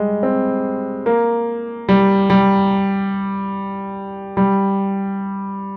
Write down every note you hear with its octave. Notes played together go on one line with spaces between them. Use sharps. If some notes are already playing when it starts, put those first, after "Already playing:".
Already playing: G3 G#3
C4
A#3
G3
G3
G3